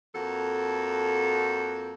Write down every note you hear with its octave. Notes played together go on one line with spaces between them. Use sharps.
F2 A#3 F#4 A4